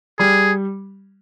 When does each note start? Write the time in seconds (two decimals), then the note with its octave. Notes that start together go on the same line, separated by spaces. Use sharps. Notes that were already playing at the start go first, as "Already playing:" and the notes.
0.19 G3 G#4